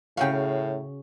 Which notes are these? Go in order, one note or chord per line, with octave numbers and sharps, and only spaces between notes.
A2 C#3 C#4 F#4 F5 G5